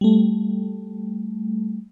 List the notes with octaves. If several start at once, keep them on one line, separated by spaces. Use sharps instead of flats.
G3 A3